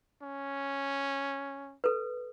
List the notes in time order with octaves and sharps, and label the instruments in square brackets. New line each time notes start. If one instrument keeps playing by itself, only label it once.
[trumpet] C#4
[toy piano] A4 B4